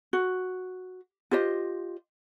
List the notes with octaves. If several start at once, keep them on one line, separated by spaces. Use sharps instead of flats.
F#4
F4 G4 C5 D#5